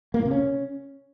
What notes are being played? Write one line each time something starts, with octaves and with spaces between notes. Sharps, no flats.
A#3
A2
C3
C#4